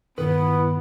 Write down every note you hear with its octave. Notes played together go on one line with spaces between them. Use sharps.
G2 A#2 D#3 B3 E4 B4